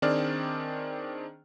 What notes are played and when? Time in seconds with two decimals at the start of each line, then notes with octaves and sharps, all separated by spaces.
0.02 D#3 C4 D4 G#4 D5 F6